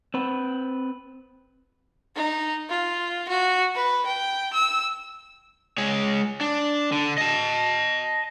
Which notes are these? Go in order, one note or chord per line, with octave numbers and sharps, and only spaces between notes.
C4 B4
D#4
F4
F#4
B4
G5
E6
G#3 C#5
D4
D3
D#5 A5